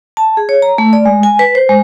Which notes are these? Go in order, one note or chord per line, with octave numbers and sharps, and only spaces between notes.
A5
G#4
C#5
A#5
A3
D5
G#3
G#5
B4
C5
G#3